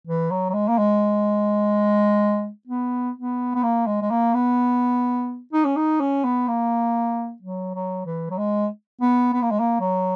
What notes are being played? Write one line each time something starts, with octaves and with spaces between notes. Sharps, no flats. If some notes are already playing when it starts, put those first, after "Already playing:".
E3
F#3
F#3
G#3
A#3
G#3
B3
B3
B3
A#3
G#3
G#3
A#3
B3
D#4
C#4
D#4
C#4
B3
A#3
F#3
F#3
E3
F#3
G#3
B3
B3
A#3
G#3
A#3
F#3